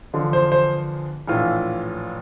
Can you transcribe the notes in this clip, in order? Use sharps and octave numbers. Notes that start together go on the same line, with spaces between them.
E2 D3 F3
C5
C5
A#1 A2 E3 F4